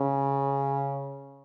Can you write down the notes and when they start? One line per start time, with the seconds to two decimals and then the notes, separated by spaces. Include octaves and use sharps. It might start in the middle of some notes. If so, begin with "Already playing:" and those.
Already playing: C#3